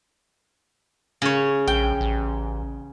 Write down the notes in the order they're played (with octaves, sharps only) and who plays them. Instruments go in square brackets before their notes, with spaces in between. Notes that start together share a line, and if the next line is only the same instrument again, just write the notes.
[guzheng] C#3 C#5
[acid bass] A#1 [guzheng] G5
[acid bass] A1